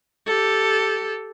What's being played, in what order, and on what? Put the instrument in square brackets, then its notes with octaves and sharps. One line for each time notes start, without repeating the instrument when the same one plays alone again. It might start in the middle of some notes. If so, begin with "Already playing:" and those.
[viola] G4 A4